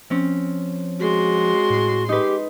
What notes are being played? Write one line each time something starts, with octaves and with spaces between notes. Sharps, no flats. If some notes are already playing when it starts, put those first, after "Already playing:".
F3 C4 C#4
G#3 F#4 C6
A2
D#4 G4 B4